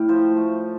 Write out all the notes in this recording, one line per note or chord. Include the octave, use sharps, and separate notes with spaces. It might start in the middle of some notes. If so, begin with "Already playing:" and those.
Already playing: A2 A3 F5 G5
F3 C5
A3